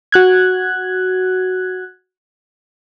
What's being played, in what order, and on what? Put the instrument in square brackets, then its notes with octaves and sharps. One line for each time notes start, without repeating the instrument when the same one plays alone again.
[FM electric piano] F#4 F#6 G#6